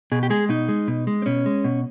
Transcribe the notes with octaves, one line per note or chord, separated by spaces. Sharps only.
B2 G#4
G4
G#3 G#4
B2 D#4
G#3
B2
G#3
C4
B2 C#4
G#3
B2